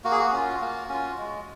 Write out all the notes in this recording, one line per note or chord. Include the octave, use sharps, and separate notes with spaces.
A#3 F#4
G#4
F#4
C#4 F4
A#3
C#4 F4
G#3